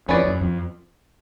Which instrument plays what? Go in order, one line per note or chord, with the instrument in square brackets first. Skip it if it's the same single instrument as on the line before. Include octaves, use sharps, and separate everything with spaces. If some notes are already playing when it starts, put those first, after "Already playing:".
[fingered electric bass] F2 [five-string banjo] C#4 E4 G#4 B4 D5
[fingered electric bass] F#2
F2